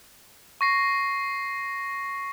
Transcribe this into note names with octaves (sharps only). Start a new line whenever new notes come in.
C#6 A#6 C7